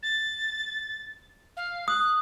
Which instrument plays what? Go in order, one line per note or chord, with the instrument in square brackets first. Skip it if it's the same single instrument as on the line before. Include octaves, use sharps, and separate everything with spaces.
[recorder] A6
F5
[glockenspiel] D#6 [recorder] F#6